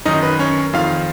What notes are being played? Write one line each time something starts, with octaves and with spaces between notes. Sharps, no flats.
F#2 D#3 D#4 D#5
B4
C#4 C#5
F2 D#3 F4 F5